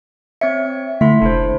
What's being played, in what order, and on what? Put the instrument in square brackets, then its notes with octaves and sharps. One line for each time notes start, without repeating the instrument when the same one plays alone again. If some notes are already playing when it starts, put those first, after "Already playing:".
[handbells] C4 C#5 C#7 [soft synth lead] E5
[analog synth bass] D3 [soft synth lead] A3 [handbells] E4 C6 B6
[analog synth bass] F1 [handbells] D4 E4 C5